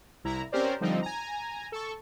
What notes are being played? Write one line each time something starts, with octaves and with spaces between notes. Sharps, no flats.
C2 E4 A#5
C4 C#4 G4 A#4 C5 D5
D3 F3 G3 C4 D#4
G#5 A#5
A4 C#6